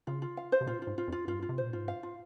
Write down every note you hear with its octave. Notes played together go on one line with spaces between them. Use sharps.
C#3 F4
F4
F5
C5
C3
A#2 F4
F4
G#2
F4
F2
F4
G2 F4
F4
C3
A#2 C5
G#2 F4
G2 F5
F4